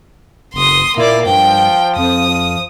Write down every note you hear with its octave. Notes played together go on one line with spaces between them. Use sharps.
F#1 C6 D#6
A#2 A#3 E4 D5
G2 F3 G5
F2 D#6
F3